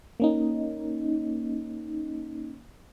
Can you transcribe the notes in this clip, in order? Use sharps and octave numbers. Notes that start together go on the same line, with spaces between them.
A#3 C#4 D#4